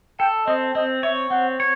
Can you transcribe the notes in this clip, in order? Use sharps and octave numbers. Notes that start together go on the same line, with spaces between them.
A4 G5
C4 D#5
C4 D#5
C#5 E5
C4 F#5
C#5